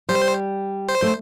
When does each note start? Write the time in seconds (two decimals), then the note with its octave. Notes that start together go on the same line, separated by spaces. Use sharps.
0.09 G3 C5
0.89 C5
1.02 A3